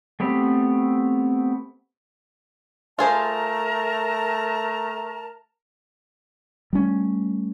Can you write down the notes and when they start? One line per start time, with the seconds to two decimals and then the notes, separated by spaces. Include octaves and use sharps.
0.20 A3 B3 C4 G4 B5
2.99 A3 F4 G#4 A#4 C5 A5 A#5
6.73 G3 A3 C#4